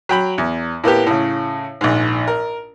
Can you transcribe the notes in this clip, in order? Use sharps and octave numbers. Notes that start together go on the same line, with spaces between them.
F#3 G5 B5
E2
A2 A#3 B3 G4
A2 C#3
A#1 G#2
A#4